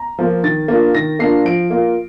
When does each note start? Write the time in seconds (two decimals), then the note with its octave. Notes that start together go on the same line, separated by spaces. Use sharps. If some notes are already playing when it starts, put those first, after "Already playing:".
Already playing: A#5
0.19 F3 A#3 F4
0.43 D#3 A6
0.68 A#3 D4 F4
0.94 D#3 A#6
1.19 A#3 D4 F4 C7
1.45 F3 D7
1.70 A#3 F4